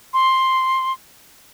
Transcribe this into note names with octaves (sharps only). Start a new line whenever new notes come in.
C6